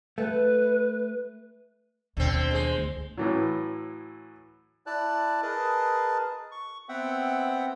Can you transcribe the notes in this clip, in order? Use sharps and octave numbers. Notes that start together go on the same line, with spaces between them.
A3 B4
D#2 B2 D3 C4
G#3 C5
D2
A2 E3 F#3
E4 D5 A5 F#6
G#4 A#4 B4 D#5 A5
C#6
B3 C4 E5 F#5 G5